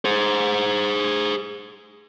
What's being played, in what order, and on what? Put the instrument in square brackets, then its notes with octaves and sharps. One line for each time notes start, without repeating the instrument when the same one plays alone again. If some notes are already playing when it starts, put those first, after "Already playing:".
[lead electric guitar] G#4 C5